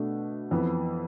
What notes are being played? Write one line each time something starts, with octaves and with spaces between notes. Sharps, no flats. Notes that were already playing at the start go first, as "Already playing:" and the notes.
Already playing: B2 A3 D4
F2 E3 B3